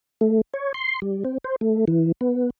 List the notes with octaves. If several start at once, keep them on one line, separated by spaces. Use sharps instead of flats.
A3
C#5
C6
G3
C4
C5
A3
E3
B3